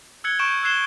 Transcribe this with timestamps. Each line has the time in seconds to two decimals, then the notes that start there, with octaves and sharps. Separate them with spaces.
0.24 E6 F#6 G#6 C#7 F#7 G7
0.39 C#6 G6 D7 E7
0.63 E6 F#6 G#6 C7 E7 G7